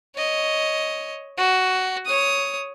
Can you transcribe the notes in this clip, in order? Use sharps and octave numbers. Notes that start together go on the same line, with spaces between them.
C#5 D#5
F#4
C#5 D#6